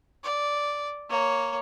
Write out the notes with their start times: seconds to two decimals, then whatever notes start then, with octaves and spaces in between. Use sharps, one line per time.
0.24 D5
1.09 A#3 C#5